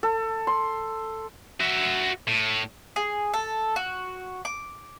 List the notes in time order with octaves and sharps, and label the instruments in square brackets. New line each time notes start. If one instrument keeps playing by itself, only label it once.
[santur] A4
C6
[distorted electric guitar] F#4 E5
A2
[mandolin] G#4
A4
F#4
D6